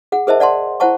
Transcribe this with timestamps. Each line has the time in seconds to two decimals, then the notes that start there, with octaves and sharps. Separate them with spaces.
0.12 G#4 F#5
0.27 G#4 A#4 C5 D#5 E5 A5
0.40 D5 F#5 A5 C6
0.80 E4 C5 F#5 A5 C#6